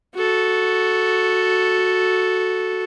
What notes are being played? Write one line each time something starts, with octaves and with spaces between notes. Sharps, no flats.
F#4 A4